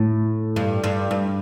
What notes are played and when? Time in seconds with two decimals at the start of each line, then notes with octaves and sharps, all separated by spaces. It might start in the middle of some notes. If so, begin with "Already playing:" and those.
Already playing: A2
0.56 G2
0.84 G2
1.11 G2